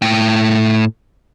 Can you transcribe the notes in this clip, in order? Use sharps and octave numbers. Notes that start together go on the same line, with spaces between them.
A2 G5